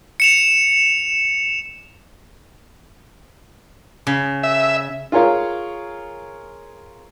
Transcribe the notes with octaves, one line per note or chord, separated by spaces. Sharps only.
C#7 E7 F7
C#3
E5
F4 G#4 A#4 C#5 F5